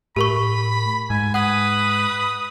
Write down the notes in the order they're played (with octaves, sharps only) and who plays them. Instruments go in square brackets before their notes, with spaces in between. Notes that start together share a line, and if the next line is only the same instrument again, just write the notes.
[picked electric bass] A2 [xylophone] G4 A#4 C#6 [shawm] B5
[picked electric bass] G#2 [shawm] G#5
[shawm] B4 [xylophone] F#5 [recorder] D#6